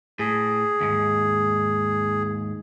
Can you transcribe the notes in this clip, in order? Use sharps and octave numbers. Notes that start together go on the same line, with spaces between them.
A2 G#4
D#2 G#2